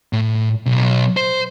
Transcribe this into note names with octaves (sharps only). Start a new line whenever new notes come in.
A2
B1
C5